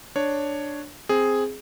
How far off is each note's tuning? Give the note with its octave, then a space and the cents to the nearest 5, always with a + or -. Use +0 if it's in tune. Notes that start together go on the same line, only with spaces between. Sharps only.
D4 +5 C#5 +0
C4 +0 G#4 +0